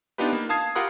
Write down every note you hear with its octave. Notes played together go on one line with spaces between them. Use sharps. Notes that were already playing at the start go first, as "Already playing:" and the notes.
B3 D4 D#4 F4 G4 B4
A#3
F5 A5 D#6 G#6 C7
F4 G4 A#4 F#5 B5 D#6